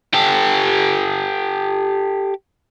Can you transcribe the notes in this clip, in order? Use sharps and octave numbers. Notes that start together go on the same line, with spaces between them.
G4 A4